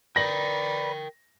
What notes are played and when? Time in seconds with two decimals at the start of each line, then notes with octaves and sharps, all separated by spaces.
0.16 A#4 B4 D5 G5 A#6 F#7